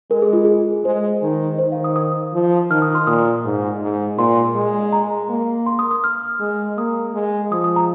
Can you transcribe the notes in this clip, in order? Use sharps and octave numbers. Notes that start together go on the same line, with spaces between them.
G#3 A#4
G#4
F4
G#4
G#3 C5
D#3
D#3 C5
F5
D#6
D#6
F3
D#3 F6
D#6
C6
A#2 D#6
G#2
G#2
A#2 C6
G#3
A#5
A#3
C6
D#6
D#6
F6
G#3
A#3 D#6
G#3
F3 D#6
D#6
A#5